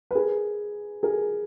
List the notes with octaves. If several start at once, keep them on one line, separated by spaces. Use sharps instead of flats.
B4
G#4 A#4
G#4 A#4